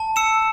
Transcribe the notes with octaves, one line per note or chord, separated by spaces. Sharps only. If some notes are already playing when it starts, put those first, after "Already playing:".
Already playing: A5
E6 C#7 E7